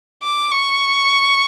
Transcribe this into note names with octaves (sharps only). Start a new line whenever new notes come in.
D6
C#6